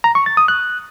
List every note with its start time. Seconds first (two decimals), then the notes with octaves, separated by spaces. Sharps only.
0.04 A#5
0.15 C#6
0.26 A6
0.37 D#6
0.48 F#6